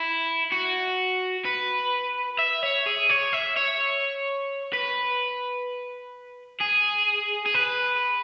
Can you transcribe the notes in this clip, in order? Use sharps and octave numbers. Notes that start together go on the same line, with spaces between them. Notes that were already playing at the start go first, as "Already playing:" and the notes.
Already playing: E4
F#4
B4
E5
C#5
G#4
C#5
E5
C#5
B4
G#4
G#4
B4